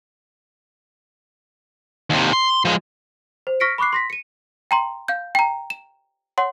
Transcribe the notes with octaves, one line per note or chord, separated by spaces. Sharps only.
D#2 C3
C6
F3 G#3
C5
C#6 F6 A#6 B6 C#7 D7
B5 C#6 D6 F#6 C7
C6 A#6 B6
C#7 D#7
G5 A#5 C6
F5 G6
G5 A#5
E7
C#5 F#5 C6